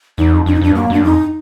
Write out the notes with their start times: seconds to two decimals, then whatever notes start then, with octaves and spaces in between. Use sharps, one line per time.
0.18 E2 D#4
0.33 F2
0.46 F2 D4
0.55 D#4
0.61 F2 D4
0.71 G2
0.75 F#2 A#3
0.90 F#2 D4
1.04 F2 D#4